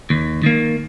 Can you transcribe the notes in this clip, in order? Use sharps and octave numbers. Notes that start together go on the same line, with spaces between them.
D#2
D#3 A#3